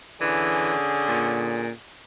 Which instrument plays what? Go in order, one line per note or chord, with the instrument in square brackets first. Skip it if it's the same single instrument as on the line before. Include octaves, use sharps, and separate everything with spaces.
[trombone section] D3 C#4 G#4 [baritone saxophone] E3
[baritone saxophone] A#2